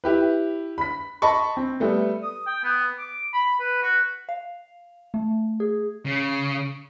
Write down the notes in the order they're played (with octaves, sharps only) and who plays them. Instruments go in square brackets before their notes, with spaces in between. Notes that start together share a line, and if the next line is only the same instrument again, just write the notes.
[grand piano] E4 G4 B4
B5 B6
D#5 A5 B5 C#6
C4
G3 A3 B3
[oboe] D#6
G5
B3
D6
B5
B4
F#4
[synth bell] F5
A3
G#4
[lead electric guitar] C#3